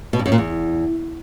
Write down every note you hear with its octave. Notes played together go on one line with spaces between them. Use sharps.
B2
G2
F#2
A#2
E2